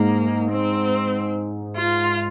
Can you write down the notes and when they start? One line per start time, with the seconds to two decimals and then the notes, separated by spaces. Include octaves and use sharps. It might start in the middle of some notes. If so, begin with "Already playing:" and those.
Already playing: G#2 G#3 A#3 D#4
0.51 C4
1.76 F4